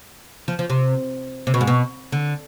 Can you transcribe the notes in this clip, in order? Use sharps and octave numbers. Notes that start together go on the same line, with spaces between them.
F3
F3
C3
C3
B2
G#2
B2
D3